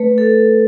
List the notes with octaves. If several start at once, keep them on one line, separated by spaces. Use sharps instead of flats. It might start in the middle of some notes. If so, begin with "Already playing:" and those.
Already playing: A3 B4
A4